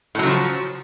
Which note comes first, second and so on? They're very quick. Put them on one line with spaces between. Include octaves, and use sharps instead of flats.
A2 F#3 C#3 F3